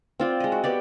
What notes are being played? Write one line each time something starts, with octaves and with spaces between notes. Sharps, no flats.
C4 F4 D5
G#3 D#5
F#4
B3 G4 D5